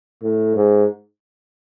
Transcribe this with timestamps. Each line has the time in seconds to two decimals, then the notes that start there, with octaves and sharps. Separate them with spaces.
0.23 A2
0.56 G#2